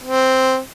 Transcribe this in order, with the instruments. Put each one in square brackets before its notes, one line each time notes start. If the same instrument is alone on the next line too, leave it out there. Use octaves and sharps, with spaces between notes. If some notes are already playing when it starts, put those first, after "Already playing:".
[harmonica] C4